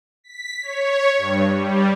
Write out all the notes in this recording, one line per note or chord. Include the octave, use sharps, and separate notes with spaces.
B6
C#5
G2
G3